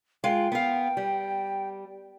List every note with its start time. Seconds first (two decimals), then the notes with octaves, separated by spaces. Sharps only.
0.24 G#3 F4 G5
0.52 B3 F5
0.97 G3